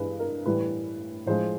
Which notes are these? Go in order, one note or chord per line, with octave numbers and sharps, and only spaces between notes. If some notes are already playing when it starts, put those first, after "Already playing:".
Already playing: G2 E3 G#3 B4
A#4
A2 E3 G3 B4
A2 F3 G#3 C5